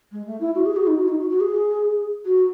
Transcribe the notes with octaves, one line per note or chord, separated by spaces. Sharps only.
G#3
A3
E4
F#4
G#4
F#4
D#4
F#4
D#4
F#4
F#4
G#4
F#4